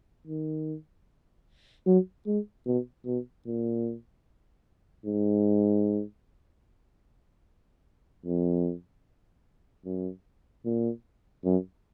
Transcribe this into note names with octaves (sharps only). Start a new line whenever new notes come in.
D#3
F#3
G#3
B2
B2
A#2
G#2
F2
F#2
A#2
F#2